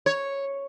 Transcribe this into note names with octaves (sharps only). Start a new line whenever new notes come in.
C#5